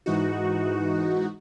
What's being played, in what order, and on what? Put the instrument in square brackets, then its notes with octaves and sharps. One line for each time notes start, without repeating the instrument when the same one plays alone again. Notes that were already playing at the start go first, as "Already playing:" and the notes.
[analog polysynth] G#2 E3 D#4 F#4